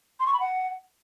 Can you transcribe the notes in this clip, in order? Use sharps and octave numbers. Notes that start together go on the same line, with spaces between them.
C6
C#6
B5
F#5